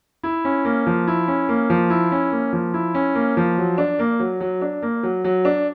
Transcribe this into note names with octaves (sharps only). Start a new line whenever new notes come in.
E4
C#4
A#3
F3
E4
C#4
A#3
F3
E4
C#4
A#3
F3
E4
C#4
A#3
F3
F#3
D4
A#3
F#3
F#3
D4
A#3
F#3
F#3
D4